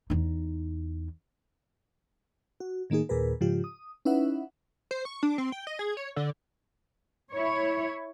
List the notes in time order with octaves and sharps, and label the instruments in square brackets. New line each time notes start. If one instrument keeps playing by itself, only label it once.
[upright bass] E2 D#4
[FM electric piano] F#4
A2 D#3 A#3 D#4 G#4
D#2 A#2 G#4 A#4 B4
G#2 C#3 F3 F4 G4
D#6
C#4 D#4 E4 B4 E5 F#5
[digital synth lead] C5
C#6
D4
C4
G5
D#5
G#4
C#5
D3
[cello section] E4 C#5